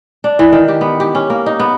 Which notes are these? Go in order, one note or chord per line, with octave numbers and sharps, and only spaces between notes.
D4
E3
D#3
G4
B3
G4
C#4
A#3
D#4
B3